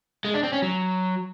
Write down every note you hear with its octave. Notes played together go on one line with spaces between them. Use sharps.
G#3
D4
C4
C#4
F#3